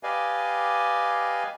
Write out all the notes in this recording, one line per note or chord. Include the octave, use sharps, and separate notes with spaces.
G4 B4 D5 D#5 F5 G#5